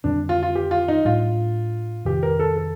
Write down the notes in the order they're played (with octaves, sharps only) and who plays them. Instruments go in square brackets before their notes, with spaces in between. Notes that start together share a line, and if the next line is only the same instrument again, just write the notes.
[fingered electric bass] F2 D3 G3 C4 [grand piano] D4
[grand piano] F4
F4
G4
F4
D#4
[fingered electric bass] A2 G3 D4 [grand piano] F4
[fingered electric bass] F2 C3 D#3 [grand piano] G4
[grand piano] A#4
A4
A4